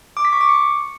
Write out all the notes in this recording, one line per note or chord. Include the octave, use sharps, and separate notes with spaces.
D6
B6
C#6
D6
C#7